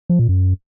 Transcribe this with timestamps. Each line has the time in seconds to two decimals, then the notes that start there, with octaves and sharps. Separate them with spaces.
0.09 F3
0.19 A#2
0.29 F#2